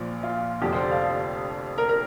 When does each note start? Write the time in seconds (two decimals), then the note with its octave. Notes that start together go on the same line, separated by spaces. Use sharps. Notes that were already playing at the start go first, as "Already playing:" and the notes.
Already playing: A#1 A#2 F3
0.23 F4
0.61 F1 F2 D3 G4
0.72 C5
0.81 D5
0.91 F5
1.78 A#4
1.89 A#4